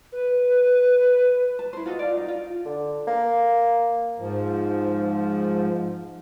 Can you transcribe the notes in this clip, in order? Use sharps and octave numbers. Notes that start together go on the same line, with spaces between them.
B4
A5
E4 C5
F4 F#4 A4 D#5
D5 F5
D#4
F4
D3
A#3
G#2 F3